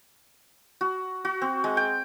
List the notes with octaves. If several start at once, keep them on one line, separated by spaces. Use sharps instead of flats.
F#4
F#4
C4
G#3
G5